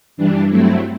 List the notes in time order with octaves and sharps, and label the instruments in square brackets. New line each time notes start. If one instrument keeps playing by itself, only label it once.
[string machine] G2 E3 G3 D4
G2 F#3 A3 C4 E4